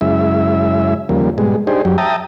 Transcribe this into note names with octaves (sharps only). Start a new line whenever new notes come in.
F#2 C#3 G#3 E4 E5
D#2 C#3 F3 G3 A#3
G#2 B2 G3 G#3
D4 D#4 G4 G#4 C5
F#2 F#3 G4
E5 G5 A5 A#5 D#6